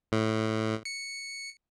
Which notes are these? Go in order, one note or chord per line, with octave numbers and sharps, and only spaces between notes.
A2
C#7